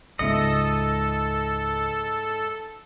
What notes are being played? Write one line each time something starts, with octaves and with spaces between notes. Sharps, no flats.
C#2 G#2 A4 D#5 E5 C#7